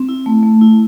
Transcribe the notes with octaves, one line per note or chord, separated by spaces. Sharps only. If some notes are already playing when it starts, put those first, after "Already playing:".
Already playing: C4
E4
A3
A3
E4